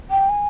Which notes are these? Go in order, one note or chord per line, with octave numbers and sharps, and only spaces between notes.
G5
G#5